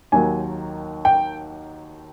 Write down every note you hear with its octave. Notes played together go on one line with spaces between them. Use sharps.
D#2 D#3 F#3 G#5
G5